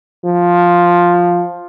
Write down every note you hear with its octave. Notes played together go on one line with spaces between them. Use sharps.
F3